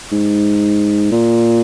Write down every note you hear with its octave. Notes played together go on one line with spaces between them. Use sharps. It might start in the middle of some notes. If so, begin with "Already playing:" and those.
G#2
A#2